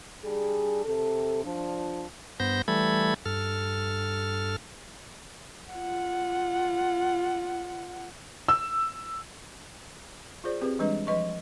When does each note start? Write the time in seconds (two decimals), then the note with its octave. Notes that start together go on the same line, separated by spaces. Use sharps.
0.24 G3 D4 G#4
0.85 C3 A4
1.44 F3 D4
2.40 G2 B3 C5 G6 A#6
2.68 E3 G3 A3 A4 B5 G#6
3.26 G2 A4 F6
5.71 F4 F#5
8.48 E6
10.44 F4 G#4 C5 D5
10.61 C4 G4 G#4 B4
10.79 E3 G3 G#3 D4 B4 D#5
11.07 F3 B4 D#5 C#6